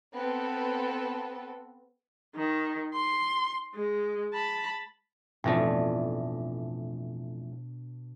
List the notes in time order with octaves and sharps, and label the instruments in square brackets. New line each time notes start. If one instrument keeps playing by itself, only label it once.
[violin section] B3 C4 A4
[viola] D#3
C6
G#3
A5 B5
[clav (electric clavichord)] A1 F2 A3 [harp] B2 D4